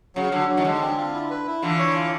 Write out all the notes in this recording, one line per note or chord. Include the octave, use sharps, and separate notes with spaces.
C#3 F#3
D3 F#3
F#3
D#3
D3 G#3
C4
F4
E4
B4
E4
D3 E3 F4
C#5
F4